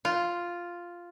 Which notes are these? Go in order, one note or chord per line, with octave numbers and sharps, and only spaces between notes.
F4